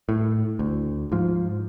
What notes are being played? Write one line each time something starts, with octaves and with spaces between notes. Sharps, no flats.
A2
D2
G#2 F3